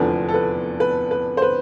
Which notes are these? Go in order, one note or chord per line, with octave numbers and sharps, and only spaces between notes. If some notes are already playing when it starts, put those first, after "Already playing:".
Already playing: F1 E2 D3 F3 B4
A4
B4
B4
B4
C5
B4